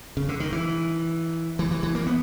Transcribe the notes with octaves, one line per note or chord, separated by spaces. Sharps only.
C#3
D3
D#3
E3
E3
E3
E3
A#3
B3